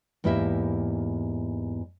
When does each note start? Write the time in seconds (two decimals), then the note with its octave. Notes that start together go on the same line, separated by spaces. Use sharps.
0.24 E2 G#2 A#3 E4 G4 E5